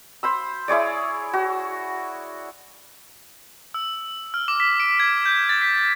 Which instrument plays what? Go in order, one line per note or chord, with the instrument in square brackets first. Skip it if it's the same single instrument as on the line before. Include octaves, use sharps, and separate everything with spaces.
[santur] C5 B5 E6
E4 G#4 C#5 D5
F#4
[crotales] E6
F6
D6
B6
D7
G#6
G6
A6
B6